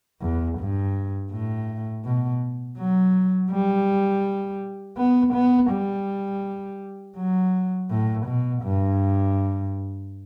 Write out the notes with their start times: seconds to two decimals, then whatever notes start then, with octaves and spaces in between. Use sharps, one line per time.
0.22 E2
0.59 G2
1.32 A2
2.05 B2
2.78 F#3
3.52 G3
4.97 B3
5.34 B3
5.71 G3
7.17 F#3
7.90 A2
8.26 B2
8.63 G2